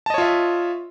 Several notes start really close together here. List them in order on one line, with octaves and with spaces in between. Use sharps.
A5 D#5 C#5 F4 E5